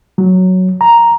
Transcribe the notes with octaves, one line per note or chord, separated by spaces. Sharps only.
F#3
A#5